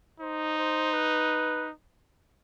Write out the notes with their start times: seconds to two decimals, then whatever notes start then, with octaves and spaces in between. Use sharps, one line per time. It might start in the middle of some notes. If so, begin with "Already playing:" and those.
0.20 D#4 C5
0.57 C5
0.93 B4